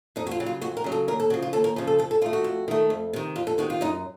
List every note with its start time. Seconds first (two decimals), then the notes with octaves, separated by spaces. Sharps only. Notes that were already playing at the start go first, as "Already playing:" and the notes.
0.16 F2 D#4
0.27 F#4
0.31 F4
0.40 C#3 F#3
0.46 F4
0.61 F2 F#4
0.77 A#4
0.84 C#3 F#3
0.92 A4
1.08 D#2 A#4
1.20 A4
1.30 C#3 F#4
1.34 F3
1.42 F4
1.53 D#2 A4
1.64 A#4
1.76 C#3 F3
1.87 A4
1.99 F2 A4
2.11 A4
2.22 D#3 A3 F4
2.33 F#4
2.44 F2
2.68 D#3 A3
2.90 F2
3.13 C3 D#3
3.36 F2 F4
3.47 A4
3.58 C3 D#3 F#4
3.70 F4
3.81 F#2 D#4